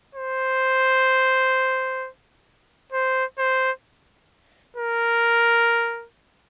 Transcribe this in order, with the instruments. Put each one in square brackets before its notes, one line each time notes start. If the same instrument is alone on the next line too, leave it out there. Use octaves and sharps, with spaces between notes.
[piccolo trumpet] C5
C5
C5
A#4